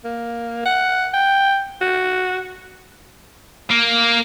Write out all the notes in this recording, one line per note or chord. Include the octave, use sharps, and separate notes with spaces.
A#3
F#5
G5
F#4
A#3